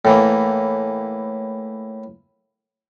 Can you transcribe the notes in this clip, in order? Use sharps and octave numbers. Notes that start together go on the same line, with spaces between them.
A2 E3 A#3